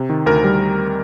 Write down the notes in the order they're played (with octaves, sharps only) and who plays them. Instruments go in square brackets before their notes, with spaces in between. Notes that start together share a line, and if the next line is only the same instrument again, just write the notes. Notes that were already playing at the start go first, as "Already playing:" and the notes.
Already playing: [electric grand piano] C3
D#3
D2 A#4
G3